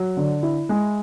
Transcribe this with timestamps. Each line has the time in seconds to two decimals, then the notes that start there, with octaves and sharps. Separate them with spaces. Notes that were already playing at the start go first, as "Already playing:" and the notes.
Already playing: F#3
0.17 D3
0.43 E4
0.69 G#3